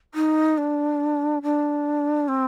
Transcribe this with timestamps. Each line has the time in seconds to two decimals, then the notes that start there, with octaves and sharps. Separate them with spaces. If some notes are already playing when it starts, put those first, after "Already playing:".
0.15 D#4
0.58 D4
1.43 D4
2.28 C4